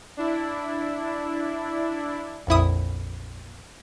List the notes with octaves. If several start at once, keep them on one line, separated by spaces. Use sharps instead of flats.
D4 E4
A#1 F2 E4 D#6